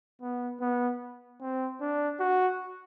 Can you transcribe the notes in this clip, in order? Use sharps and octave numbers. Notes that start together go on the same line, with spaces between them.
B3
B3
C4
D4
F#4